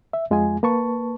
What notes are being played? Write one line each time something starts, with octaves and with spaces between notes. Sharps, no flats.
E5
F2 G#3 F4 G#4 G#5
A#3 B4 A5 C#6